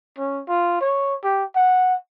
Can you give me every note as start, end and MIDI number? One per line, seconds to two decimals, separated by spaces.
0.18 0.41 61
0.48 0.79 65
0.81 1.15 73
1.24 1.44 67
1.55 1.94 78